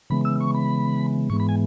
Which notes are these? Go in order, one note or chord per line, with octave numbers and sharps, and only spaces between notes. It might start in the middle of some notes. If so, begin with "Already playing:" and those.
C#3 E3 G#3 B3 B5
E6
C#6
B5
G#2 E3 G#3 B3 C#6
B5
G#5